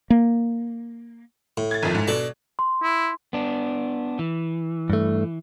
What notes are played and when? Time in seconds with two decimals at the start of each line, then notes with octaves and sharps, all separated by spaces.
0.10 A#3
1.57 A2
1.71 G#6 A6
1.83 G#1 F2
1.95 G#2
2.08 B2 D4 A4
2.59 C6
2.83 E4
3.33 B3 D4
4.19 E3
4.90 G2 A3